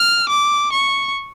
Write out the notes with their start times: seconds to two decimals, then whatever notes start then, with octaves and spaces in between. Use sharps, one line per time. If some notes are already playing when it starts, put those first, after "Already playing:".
Already playing: F6
0.29 D6
0.72 C#6